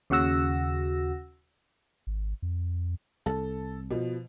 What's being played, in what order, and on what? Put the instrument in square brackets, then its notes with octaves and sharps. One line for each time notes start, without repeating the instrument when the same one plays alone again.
[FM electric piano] D#2 C#3 F#4 F#5 E6 A#6
[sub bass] G#1
F2
[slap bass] C2 [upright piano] A4
[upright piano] B2 F3